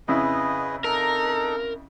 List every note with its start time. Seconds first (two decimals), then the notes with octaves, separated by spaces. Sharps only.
0.08 F2 C#3 E4 G#4 B4 D#5
0.84 D#4 A4 A#4